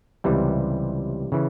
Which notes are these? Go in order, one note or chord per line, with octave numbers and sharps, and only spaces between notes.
C#2 C3 E3 G3
C#3 E3